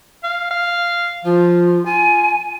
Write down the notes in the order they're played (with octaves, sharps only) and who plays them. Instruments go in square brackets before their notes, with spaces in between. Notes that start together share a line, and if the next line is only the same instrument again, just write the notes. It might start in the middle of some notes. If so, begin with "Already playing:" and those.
[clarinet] F5
F5
[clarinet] F3 [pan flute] F4
[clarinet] F4 [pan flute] G#5